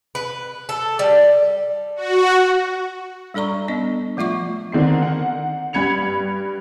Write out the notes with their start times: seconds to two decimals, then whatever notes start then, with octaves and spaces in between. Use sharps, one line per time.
0.15 B4
0.69 A4
0.99 G3
1.96 F#4
3.34 G3 D4 A4 D5 A#5 C#6
3.68 B3 D4 D#5
4.17 F3 A3 F4 E5 C#6 D6
4.72 D3 D#3 C4 C7
5.03 F#5
5.73 G2 B5 G#6 C#7 F7